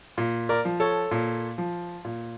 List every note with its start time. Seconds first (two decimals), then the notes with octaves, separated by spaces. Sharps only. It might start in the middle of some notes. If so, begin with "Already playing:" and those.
0.18 A#2
0.49 A#4 D5
0.65 F3
0.80 A4 C#5
1.11 A#2
1.58 F3
2.05 A#2